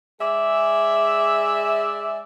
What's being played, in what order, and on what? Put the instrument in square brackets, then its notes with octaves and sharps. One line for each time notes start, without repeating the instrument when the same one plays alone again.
[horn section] G#3 G#4 D5 E5